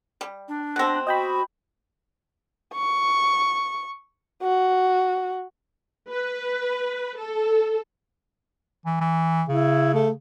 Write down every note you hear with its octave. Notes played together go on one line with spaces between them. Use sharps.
G3
D4
B2 C4 F#6 A#6
F#4 D#5 G5 B5
C#6
F#4
B4
A4
E3
E3
C#3 E4
A3